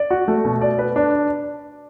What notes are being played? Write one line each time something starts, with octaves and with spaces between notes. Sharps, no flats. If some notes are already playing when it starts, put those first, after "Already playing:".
Already playing: D5
F#4
A3
B2
D5
B4
D4